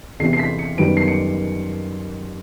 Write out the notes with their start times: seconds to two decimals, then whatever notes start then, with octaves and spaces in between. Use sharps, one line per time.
0.20 E2 C3 E3 C7
0.33 C7
0.39 B6
0.59 C#7
0.78 F#2 D#3 G3 B3 D7
0.97 C7
1.08 C#7